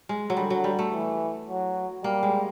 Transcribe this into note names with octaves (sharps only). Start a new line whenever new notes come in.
G#3
F#3
D3 G3
F#3
G3
A3
E3
F#3
G3 A#3
G#3